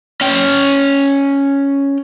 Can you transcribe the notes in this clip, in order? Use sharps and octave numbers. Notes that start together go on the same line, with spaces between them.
C#4 G5